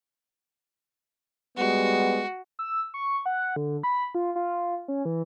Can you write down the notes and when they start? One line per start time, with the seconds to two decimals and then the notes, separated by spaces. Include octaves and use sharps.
1.57 G3 G#3 B3 F#4
2.59 E6
2.94 C#6
3.26 F#5
3.56 D3
3.83 B5
4.15 F4
4.36 F4
4.88 C#4
5.05 E3